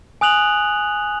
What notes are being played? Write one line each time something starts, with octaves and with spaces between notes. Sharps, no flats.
G#5 D#6 F#6 F7 F#7